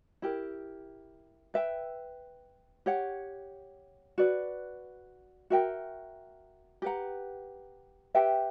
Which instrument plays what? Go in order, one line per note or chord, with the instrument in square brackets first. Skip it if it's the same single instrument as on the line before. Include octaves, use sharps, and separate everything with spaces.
[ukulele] E4 G4 A#4
B4 E5 G5
G4 C#5 F#5
F#4 B4 D5
F#4 A#4 E5 G5
G4 B4 F#5 A#5
G4 B4 E5 G5